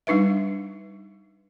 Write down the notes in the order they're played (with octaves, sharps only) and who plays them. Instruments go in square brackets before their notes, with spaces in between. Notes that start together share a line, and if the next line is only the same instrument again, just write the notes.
[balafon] G3 D4 D#4 B4 E5